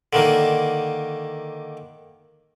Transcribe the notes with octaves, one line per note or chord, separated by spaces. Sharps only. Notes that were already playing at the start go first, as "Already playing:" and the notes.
D3 D#3 A#3